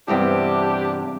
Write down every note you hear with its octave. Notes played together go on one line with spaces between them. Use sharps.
E2 G2 C3 D4 G4